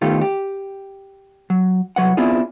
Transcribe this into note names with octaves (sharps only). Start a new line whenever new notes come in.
D#3 A3 B3 F4 G4 A4
G4
F#3
C2 F#3 B4 F#5
B3 C4 D4 E4 F4 G#4